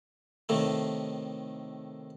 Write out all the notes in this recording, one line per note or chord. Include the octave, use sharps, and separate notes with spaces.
A2 C3 D#3 A3